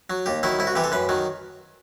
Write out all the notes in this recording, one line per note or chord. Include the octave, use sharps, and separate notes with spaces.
F#3
D#2 G4
D#3 F#3 E4
C2 E4
F#4
C3 E3 G4
A4
F#2 B4
D#3 F#3